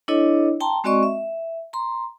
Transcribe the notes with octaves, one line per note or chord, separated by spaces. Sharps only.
D4 E4 A4 C#5 D#5
G5 A5 A#5 C6
G#3 C4 F#4 D5 D#5 C#6
E5
A#5 C6